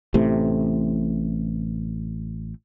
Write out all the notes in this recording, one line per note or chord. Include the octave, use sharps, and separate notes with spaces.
A1 A2 C3 A3